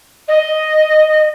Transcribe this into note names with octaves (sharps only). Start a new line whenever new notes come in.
D#5